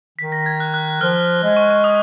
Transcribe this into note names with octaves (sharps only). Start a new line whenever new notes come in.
D#3 B6
A#6
G#6
F#6
F#6
F3 F6
G#3
C#6
C#6
D#6